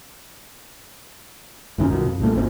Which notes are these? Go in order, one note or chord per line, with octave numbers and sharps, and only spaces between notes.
C#2 F#2 D#3 C#4
C2 B2 D#3
F2
C2 A#2 G#3 A3
G#1 D#2 C4